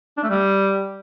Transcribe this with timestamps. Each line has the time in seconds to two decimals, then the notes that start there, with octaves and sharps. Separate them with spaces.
0.17 D4
0.23 A3
0.29 G3